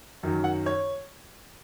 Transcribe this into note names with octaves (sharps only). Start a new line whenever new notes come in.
F#2 D#3 F#3
F#5
C#5